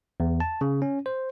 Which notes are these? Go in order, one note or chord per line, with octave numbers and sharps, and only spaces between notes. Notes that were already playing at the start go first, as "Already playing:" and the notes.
E2
A5
C#3
C#4
C5